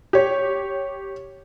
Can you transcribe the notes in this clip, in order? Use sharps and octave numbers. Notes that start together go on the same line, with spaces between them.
G4 C#5